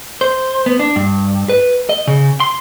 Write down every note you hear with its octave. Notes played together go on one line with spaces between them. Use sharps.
C5
B3
D4
G2
B4
D#5
C#3
C6